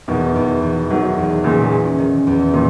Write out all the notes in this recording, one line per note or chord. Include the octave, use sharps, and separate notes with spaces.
E2 B2 D#3
E2
E2
E2 D#3 F#3
E2
E2 A#2 C#3
C#4
D#3
E2
A#2 D#3